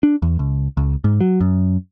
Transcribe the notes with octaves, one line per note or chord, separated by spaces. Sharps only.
D4
E2
C#2
C#2
G#2
F#3
F#2